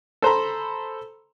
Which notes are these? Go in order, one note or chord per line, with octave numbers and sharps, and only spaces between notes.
A4 C5 A#5 B5